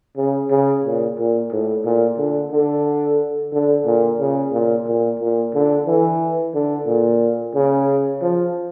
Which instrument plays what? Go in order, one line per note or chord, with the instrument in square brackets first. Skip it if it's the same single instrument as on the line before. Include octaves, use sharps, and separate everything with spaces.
[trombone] C#3
C#3
A#2
A#2
A2
A#2
D3
D3
D3
A#2
C#3
A#2
A#2
A#2
D3
E3
D3
A#2
C#3
F3